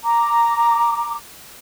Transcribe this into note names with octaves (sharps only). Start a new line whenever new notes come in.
A#5 D6